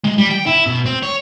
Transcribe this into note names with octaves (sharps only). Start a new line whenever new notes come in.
G#3
G3
G5
E4
B2
C4
C#5